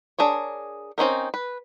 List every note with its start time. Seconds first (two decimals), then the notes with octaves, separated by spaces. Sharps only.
0.19 D4 G#4 A#4 C#5
0.98 C4 C#4 D#4 A#4
1.34 B4